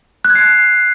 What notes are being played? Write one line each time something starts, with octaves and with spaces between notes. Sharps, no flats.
F#6
G#6
C7